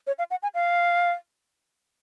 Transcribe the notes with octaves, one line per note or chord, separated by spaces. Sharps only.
C#5
F5
F#5
G#5
F5